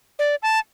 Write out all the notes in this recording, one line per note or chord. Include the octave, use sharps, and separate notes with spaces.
D5
A5